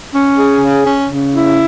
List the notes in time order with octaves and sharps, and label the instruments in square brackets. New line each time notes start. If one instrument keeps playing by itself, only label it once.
[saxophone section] C#4
G#4
C#3
C#4
C#3
E4